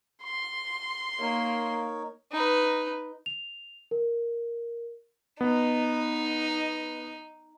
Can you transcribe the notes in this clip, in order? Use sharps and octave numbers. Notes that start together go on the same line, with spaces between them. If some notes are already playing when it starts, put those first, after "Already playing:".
C6
A#3 D#4 A#4 C#5
D#4 B4
F7
A#4
B3 D#4